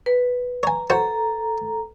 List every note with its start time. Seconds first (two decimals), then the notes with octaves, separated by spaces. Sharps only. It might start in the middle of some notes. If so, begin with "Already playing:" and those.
0.06 B4
0.63 C#5 G#5 A#5
0.90 F#4 A4 C5 C#5 A#5